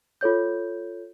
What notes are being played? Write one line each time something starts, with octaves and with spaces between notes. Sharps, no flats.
F4 A4 C#5 G6